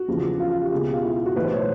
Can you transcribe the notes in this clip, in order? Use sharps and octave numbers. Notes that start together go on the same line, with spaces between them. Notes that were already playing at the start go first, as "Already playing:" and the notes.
Already playing: F#4
E2 C#3 F3
F4
F4
G4
C#2 B2 G#4
G4
F4
E4
F4
F#4
B1 A2 E3 B4
C5
C#5
C5